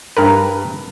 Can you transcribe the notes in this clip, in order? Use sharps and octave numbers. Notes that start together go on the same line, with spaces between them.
G2 A#4 B4